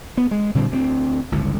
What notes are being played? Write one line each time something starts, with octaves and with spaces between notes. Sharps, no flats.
B3
G#3
A#2 D3 G3 C4
D2 G3 C4
G1 C#2 A2